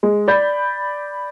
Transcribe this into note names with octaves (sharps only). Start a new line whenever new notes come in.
G#3
D5 B5 G6